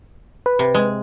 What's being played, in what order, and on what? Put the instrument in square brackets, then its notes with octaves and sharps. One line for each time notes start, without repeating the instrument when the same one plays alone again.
[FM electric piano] B4
[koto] C3
G#3